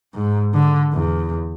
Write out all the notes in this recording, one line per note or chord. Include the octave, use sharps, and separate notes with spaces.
G#2
D3
E2